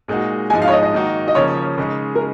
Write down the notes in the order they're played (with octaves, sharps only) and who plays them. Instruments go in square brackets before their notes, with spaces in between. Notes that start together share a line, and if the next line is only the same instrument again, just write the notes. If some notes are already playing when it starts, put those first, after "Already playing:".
[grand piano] A#2 G#3 D#4 F#4
[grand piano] G#2 F3 G#3 D#4 [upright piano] G#5
[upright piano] F5
C#5
D#5
D#5
[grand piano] D#3 A#3 D#4 F#4
[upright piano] D#5
[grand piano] C#3 F3 A#3 C#4 [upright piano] C#5
[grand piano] C#3 G#3 D#4
[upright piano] A#4